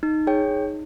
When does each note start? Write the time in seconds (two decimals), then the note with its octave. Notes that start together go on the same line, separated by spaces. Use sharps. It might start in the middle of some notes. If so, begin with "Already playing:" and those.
0.03 D#4
0.27 G#4 C#5 G5
0.51 D#4